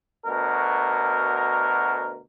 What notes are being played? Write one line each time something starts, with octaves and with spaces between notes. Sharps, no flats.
D2 B2 A#4